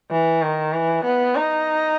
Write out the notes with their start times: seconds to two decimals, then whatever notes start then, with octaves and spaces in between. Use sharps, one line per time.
0.11 E3
0.42 D#3
0.73 E3
1.05 B3
1.36 D#4